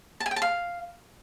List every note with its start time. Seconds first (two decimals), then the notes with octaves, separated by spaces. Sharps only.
0.20 A5
0.26 G#5
0.31 G5
0.36 A5
0.42 F5